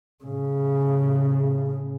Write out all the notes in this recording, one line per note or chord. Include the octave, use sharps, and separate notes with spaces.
A2 C#3